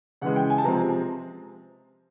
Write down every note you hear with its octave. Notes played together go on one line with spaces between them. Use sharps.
C#3 E3 G#3 F#5
G5
G#5
A5
C3 F3 G#3 C4 A#5